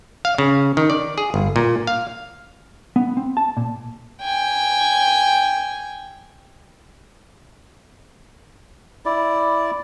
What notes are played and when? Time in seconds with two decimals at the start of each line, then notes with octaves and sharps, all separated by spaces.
0.25 F5
0.38 C#3
0.77 D#3
0.90 D5
1.18 G#4
1.34 G1
1.56 A#2
1.87 F5
2.96 B3
3.17 C4
3.37 A5
3.57 A#2
4.22 G5 G#5
9.06 E4 D5